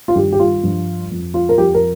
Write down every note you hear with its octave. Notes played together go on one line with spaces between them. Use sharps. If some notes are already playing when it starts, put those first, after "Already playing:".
F4
G2 D#3 G3 G4
G4
F4
G2 F3
F2 F3
F4
A#4
F2 F3 G4
A#4